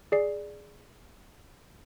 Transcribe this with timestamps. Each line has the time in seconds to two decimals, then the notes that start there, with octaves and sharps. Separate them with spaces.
0.12 G#4 D5 C7